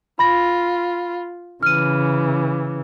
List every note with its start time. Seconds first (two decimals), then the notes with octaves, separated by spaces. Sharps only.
0.19 F4 B5 A#6
1.63 C#3 E3 F6 D#7